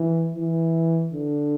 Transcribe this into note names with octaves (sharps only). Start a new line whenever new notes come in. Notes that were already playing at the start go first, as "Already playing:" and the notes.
Already playing: E3
E3
D3